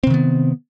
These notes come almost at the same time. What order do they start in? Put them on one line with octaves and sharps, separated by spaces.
C4 C3 D#3 B3